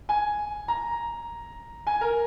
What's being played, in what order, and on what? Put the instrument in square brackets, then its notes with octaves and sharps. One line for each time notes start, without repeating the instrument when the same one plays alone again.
[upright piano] G#5
A#5
G#5
A#4